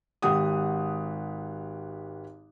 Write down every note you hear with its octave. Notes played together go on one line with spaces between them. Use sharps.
G#1 G4 F#5 D#6